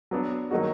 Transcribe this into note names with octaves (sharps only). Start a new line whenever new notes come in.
F#3 B3 D4
D#3 F#3 A#3 D#4 F#4